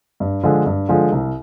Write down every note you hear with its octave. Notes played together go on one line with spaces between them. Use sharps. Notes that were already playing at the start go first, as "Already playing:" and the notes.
G2
D3 F3 G#3
G2
D3 F3 G#3
C2